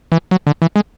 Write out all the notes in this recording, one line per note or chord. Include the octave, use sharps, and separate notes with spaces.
E3
F#3
D3
E3
G#3